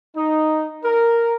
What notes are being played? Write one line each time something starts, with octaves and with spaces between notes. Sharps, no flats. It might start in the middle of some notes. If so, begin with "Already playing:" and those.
D#4
A#4